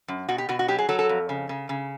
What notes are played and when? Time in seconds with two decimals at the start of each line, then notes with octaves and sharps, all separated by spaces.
0.08 F#2
0.29 B2 F#4
0.38 G4
0.49 B2 F#4
0.59 F#4
0.68 F#3 G4
0.79 G#4
0.89 F#3 A4
0.99 A4
1.09 F2
1.29 C#3
1.49 C#3
1.69 C#3